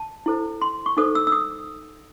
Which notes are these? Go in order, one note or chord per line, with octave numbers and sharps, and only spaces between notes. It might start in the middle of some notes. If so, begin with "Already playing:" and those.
Already playing: A5
E4 A4 C5
C6
C#6
D#4 A4 C5 D#6
E6
E6
D#6